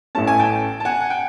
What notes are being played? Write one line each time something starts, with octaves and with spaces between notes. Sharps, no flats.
A1 A2 E3 A3 C#4 A5
G#5
G5 A5
A5
F#5 G#5
F#5
G5